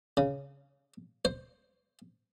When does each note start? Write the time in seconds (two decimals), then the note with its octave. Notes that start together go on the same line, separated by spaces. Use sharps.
0.17 C#3
1.25 C5